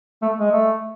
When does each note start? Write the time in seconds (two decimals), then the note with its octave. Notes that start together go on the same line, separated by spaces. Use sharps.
0.22 A3
0.40 G#3
0.52 A3